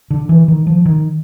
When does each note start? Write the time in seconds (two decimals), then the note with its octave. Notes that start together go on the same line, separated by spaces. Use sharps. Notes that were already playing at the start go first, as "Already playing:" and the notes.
0.10 D3
0.29 E3
0.48 D#3
0.67 F3
0.85 D#3